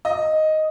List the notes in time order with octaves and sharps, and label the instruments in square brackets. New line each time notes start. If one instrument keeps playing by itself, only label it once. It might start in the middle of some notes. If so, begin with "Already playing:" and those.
[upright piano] D#5